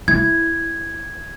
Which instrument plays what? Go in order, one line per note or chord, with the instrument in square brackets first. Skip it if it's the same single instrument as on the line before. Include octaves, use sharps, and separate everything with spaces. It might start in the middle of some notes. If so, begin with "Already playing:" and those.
[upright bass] E4 [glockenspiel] G#6